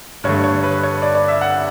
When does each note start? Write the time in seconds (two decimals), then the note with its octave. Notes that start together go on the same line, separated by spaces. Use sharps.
0.24 G2 D3 A3 C#5
0.44 C#5
0.63 B4
0.83 C#5
1.02 D5
1.15 D5
1.28 E5
1.41 F#5